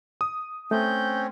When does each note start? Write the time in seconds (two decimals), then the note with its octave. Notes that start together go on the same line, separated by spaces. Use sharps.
0.21 D#6
0.71 A3 C4 C#4 G6